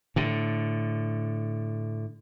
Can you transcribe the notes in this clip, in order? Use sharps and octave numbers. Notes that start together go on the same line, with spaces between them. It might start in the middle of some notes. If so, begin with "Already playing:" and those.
A2 D3